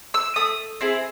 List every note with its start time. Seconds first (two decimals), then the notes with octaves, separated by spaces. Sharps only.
0.14 E6
0.36 A3 D#6
0.81 C4 E4 G#4